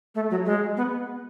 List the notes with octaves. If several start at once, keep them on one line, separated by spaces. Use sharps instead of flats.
A3
F#3
G#3
B3